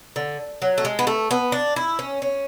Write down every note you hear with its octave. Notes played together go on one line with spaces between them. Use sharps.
D3
F#3
A3
G#3
B3
A3
B3
D4
E4
C#4
C#4